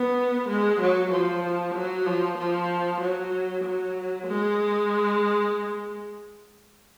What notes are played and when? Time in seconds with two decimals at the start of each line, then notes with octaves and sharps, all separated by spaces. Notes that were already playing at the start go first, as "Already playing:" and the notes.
Already playing: B3
0.49 G#3
0.81 F#3
1.12 F3
1.75 F#3
2.06 F3
2.39 F3
3.01 F#3
3.64 F#3
4.27 G#3